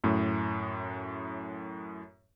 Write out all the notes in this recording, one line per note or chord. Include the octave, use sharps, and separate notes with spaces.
F#2 A2